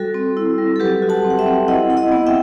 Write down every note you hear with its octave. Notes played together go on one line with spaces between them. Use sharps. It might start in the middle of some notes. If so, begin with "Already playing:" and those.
Already playing: G3 F#4 A4
C4
E4
G3
A4
F#3 G4 B4
F#4
F#5 A5
C4
F#5
E5 G5
C4
E4 D#5 F#5
E4
D#5 F#5
B3
E5 G5